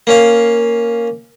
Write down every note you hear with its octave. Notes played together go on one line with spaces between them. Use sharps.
A#3 C#4 F5